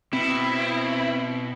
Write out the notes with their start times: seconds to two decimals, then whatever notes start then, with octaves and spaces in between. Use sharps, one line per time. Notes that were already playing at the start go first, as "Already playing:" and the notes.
0.13 B2 C4 E4